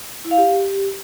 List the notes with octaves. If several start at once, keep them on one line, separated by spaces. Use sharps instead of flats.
E4
F5
G4